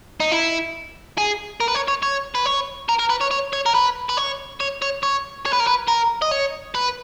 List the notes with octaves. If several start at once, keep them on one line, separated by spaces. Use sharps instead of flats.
D#4
E4
G#4
A#4
B4
C#5
C#5
C#5
B4
C#5
A#4
A#4
B4
C#5
C#5
C#5
A#4
B4
B4
C#5
C#5
C#5
C#5
C#5
B4
A#4
B4
A#4
D#5
C#5
B4